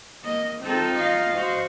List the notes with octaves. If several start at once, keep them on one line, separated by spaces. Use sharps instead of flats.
A#3 D#5
C4 D#4 F4 A4
D#5 F5
F#4 C5